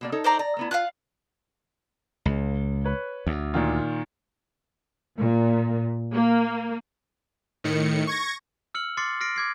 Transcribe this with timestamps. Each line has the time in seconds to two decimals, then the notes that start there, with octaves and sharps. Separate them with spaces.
0.01 B2 A#3 D5
0.12 D#4 A4 C#5
0.24 C5 D5 A#5
0.39 D5 A#5
0.57 A3 B3 E4
0.71 F4 F5 F#5 F#6
2.26 C#2
2.84 B4 C#5
3.27 D2
3.54 A#2 D#3 F4
5.18 A#2
6.13 A#3
7.64 A2 D#3 C#7
8.07 C#6 G#6 A#6
8.74 E6 F6 C#7 F#7
8.97 C6 D6 F6 A6 C7 C#7
9.21 F6 A#6 C7 D7
9.36 D6 G#6 C7